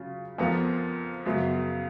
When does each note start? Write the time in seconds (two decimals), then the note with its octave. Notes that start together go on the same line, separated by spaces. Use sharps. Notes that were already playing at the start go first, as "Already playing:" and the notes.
Already playing: C#3 F#3 C#4 F4
0.38 F2 F3 B3 F4 A#4
1.25 F#2 C#3 F#3 B3